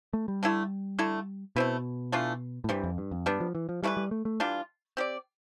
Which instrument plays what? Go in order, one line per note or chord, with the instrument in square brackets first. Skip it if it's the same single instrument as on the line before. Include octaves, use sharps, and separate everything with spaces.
[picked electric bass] A3
G3
[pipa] D3 A3 E4 A4
D3 A3 E4 A4
[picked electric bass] B2 [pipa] A3 C4 E4 B4
[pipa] E3 A3 D4 F4
[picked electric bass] A2
[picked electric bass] G2 [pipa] C3 E3 G3
[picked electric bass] F2
G2
F2
[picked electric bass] G2 [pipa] G3 B3 D4
[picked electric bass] F3
E3
F3
[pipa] E3 A3 E4 B4 [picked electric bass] G3
[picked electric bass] G3
A3
A3
[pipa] E3 G3 D4 F4
C4 G4 D5